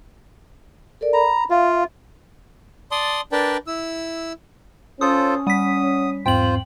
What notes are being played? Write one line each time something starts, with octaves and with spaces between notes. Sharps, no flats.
A4 A#4 D5
A#5 B5
F4 E5 F5
D5 A5 C6 D#6
D4 A#4 B4 D5 G5 A5
E4 E6
C#4 F4 A4 C5 D#6
G3 F#5 D#6 B6
E2 G#2 C4 F4 C5 G5 F#7